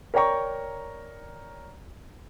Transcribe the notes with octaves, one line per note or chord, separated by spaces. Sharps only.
A#4 C#5 D5 G5 A#5 C#6